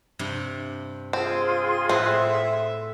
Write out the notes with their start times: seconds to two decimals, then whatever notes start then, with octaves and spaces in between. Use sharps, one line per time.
0.19 G2 C3
1.13 C4 F4 G#4 C6
1.89 A2 C4 B4 E5 F#5